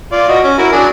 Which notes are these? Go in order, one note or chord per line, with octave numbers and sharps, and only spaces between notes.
F4 D5
F#4 D#5
C#4
E4 F#4 A#4
F#3 D4 G#4